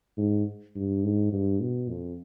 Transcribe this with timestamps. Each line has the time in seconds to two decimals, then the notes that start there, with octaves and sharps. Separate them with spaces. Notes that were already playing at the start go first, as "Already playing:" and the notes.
0.17 G#2
0.75 G2
1.04 G#2
1.32 G2
1.61 B2
1.89 F2